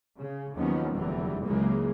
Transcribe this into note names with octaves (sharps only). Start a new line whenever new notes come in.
C#3
D#2 D#3 F3 F#3 B3 C#4
F1 E2 D3 E3 F#3 G3
C#2 C#3 E3 F#3 G#3 A#3